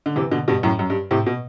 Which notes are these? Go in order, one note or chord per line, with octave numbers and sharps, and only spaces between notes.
D3
C3 E3
B2 D3
G2 B2
F#2 A2
F#2
G2
A2 C3
B2